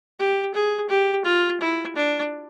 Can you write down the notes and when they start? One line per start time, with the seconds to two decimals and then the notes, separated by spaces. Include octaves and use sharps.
0.19 G4
0.54 G#4
0.89 G4
1.25 F4
1.61 E4
1.96 D4